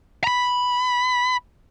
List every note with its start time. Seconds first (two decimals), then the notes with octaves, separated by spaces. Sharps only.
0.24 A#5 B5